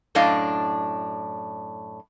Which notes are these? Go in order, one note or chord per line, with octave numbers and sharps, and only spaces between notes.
F#2 A2 D4 D#5 F5